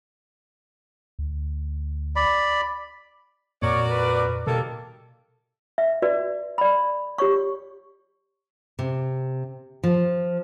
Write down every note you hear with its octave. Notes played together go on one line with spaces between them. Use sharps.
D2
D5 B5
F2 A#2 F#4 A#4 C#5 D5
B4
B2 D#3 G3 A#3 A4
E5
F#4 B4 D5
D5 B5
G4 C#5 C#6
C3
F3